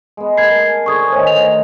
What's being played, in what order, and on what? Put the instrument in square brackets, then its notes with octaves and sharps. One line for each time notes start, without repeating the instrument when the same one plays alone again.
[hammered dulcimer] G#3 B3
[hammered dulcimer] A#4 G#5 A5 [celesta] G#6 C7
[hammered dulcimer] D3 G#4 C5 [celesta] C#6 D#6 G#6
[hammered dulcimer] D#3 A3 [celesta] C5 C#5 G#5
[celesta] F7
[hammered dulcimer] A#5